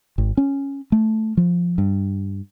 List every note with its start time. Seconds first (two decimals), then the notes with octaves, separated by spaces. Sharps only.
0.18 G#1
0.37 C#4
0.92 A3
1.37 F3
1.78 G2